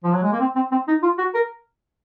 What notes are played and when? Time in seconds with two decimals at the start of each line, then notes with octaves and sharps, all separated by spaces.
0.04 F3
0.13 F#3
0.23 G#3
0.32 A#3
0.40 C4
0.56 C4
0.72 C4
0.88 D#4
1.03 F4
1.18 F#4
1.35 A#4